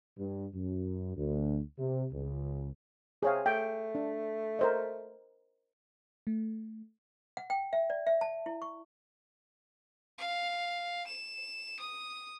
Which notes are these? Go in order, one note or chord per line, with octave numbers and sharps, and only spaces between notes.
G2
F#2
D2
C3
C#2
C3 G#4 C#5 F5
A3 G5
D4
A#4 C5 D#5
A3
F#5
G5
E5
D5
E5
A5
E4
C#6
F5
E7
D#6